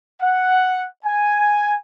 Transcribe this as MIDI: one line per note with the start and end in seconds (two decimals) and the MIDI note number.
0.21 0.86 78
1.05 1.76 80